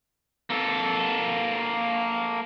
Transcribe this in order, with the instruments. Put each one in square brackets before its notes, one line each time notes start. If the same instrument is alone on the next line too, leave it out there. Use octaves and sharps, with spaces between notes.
[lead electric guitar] A#3 A4